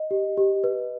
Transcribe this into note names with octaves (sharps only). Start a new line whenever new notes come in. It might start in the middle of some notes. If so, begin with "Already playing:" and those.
Already playing: D#5
G4
G4
B4